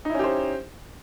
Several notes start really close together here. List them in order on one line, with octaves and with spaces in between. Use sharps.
D#4 E4 C#4 G4 C5